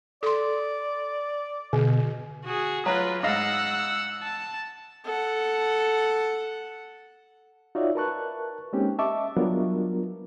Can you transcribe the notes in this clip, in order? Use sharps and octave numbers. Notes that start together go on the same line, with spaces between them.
A4 D5 C6
B2 D3
F#4 G#4
F#3 F4 B4
G#2 D#5 F5 F#5 E6
A5
A4 F#5
D#4 F4 F#4 C#5 D5 E5
A#4 B4 A5 C#6 F#6
G#3 A#3 C4 C#4 D#4 G4
D#5 E5 A5 C#6 D6
F#3 G3 B3 D4 F4 A#4